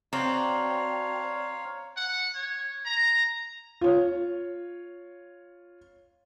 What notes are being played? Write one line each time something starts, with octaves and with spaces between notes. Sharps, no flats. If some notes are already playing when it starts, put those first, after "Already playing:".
F#3 C4 D4 C#5 F5 A#5 C6
F#5
C#5
A#5
F4 C#5